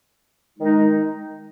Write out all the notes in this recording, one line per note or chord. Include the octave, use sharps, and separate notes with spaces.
D#3 G#3 D#4